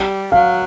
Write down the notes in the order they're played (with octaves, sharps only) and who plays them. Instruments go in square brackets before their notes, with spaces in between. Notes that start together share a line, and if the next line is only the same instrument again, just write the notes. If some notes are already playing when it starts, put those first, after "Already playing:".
Already playing: [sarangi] G3
[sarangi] F#3 [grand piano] F5